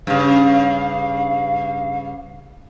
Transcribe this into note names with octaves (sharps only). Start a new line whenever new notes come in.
G2 C#3 F5